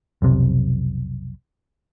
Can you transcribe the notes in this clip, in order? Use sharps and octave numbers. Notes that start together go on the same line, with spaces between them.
F1 B1 C3